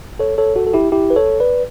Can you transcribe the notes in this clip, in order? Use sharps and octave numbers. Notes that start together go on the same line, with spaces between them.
A4 C#5
A4 C#5
F#4 A4
A4
E4 G4
E4 G4
B4
A4 C#5
B4 D5